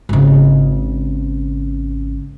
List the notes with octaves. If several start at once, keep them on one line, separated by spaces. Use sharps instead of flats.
G#1 C#3